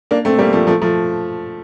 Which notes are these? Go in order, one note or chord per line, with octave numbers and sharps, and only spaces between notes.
A#3 D4
A3 C4
G3 A#3
F3 A3
F3 A3
F3 A3